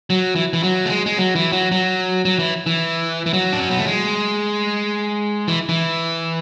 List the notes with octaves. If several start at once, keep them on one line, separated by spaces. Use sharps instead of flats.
F#3
E3
E3
F#3
A3
G#3
G#3
F#3
E3
F#3
F#3
F#3
E3
E3
E3
F#3
D4
C#4
B3
A3
G#3
E3
E3